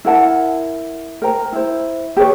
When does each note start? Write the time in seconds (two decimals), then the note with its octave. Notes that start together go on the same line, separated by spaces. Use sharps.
0.05 E4 A#4 F#5 A5
1.22 A#4 C5 G5 A#5
1.52 E4 C5
2.17 G4 G#4 B4 C#5